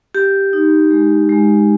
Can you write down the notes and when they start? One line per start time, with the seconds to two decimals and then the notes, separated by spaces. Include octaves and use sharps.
0.15 G4
0.53 D#4
0.91 G#3
1.29 G#3